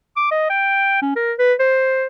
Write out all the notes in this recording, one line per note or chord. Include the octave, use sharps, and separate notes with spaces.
D6
D#5
G5
C#4
A#4
B4
C5